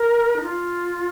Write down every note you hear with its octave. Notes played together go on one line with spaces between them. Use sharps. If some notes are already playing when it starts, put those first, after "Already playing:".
Already playing: A#4
D#4
F4